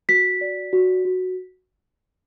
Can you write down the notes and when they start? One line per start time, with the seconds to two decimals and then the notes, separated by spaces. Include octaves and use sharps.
0.09 F#4 B6
0.41 D5
0.73 F#4
1.05 F#4